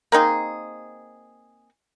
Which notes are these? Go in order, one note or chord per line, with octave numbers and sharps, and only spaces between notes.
A#3 C4 D#4 G#4